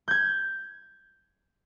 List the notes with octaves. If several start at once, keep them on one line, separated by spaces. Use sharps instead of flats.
G6 G#6